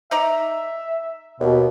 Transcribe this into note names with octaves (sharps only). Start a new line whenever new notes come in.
D#4 D5 E5 A#5
D#2 B2 B3